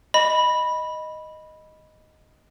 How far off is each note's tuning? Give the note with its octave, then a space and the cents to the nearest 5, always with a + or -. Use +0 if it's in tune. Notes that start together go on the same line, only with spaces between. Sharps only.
D#5 +0 B5 -5